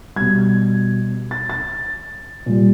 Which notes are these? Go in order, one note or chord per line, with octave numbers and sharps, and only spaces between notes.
B2 G3 G#6
A6
A6
A#2 G3